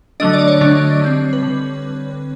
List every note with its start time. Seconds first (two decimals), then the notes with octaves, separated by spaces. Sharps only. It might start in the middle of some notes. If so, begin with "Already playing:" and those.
0.20 D3 F#3 A3 D4 D#5
0.33 D5
0.48 C#5
0.61 D3 F#3 A3 D4
1.01 D3 G3 C4
1.33 B4
1.43 D3